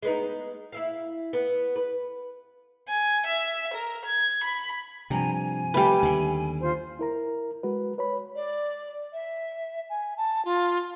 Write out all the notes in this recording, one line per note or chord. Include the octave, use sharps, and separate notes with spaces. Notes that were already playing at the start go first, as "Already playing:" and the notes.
G#3 B3 D#4
E4 E5 F5
B3
B4
G#5
E5
A#4
G#6
B5
G2 C3 F3 G#5 A#5
G#5
G3 A3 G4 B4
D#2 D3
F4 C5
E4 A#4 A#5
G#3 F#4 B4
B4 C#5 B5
D5
E5
G#5
A5
F4